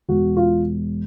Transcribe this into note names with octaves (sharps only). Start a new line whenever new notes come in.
E1 F#4
F4